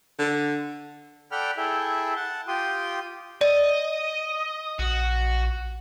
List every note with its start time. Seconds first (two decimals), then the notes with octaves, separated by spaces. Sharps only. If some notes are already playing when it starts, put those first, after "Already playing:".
0.19 D3
1.32 A4 D5 F#5 G5 B5 F6
1.57 E4 G#4 A4 E5 G5
2.16 F#5 A5
2.48 F4 G4 G5 C6 D#6
3.41 D5 D#5
4.79 A#1 F#4